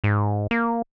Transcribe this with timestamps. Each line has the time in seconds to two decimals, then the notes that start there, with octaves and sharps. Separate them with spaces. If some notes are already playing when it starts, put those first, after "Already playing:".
0.04 G#2
0.51 A#3